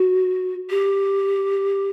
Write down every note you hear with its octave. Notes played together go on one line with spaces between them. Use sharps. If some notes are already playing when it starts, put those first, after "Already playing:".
Already playing: F#4
G4